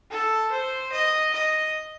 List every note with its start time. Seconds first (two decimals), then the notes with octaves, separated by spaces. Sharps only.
0.11 A4
0.51 C5
0.92 D#5
1.33 D#5